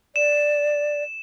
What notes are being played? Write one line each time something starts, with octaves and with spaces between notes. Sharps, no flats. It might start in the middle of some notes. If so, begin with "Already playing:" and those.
D5 E7